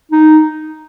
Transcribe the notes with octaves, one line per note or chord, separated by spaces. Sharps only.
D#4